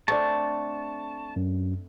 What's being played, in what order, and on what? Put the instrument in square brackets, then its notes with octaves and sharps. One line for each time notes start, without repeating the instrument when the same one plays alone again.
[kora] A3 C4 D4 [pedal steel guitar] A5 [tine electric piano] C#6
[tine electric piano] F#2